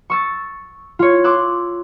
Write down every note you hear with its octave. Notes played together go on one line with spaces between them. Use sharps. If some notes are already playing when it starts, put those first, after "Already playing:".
C#6 E6 A6
F4 C#5
C6 D6 E6 F#6